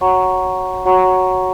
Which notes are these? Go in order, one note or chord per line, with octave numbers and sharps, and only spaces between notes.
F#4 C#5 F#5 A#5 C#6
F#4 C#5 F#5 A#5 C#6